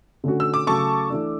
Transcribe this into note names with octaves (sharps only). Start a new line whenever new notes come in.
D3 A3 C#4 F#4
E6
D6
C#3 F#3 A3 A5 C#6
E3 A3 D4